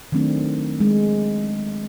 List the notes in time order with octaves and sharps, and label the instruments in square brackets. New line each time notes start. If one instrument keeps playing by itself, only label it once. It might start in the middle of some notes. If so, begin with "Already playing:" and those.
[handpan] D#3 F#3 A3 C4 D4
G#3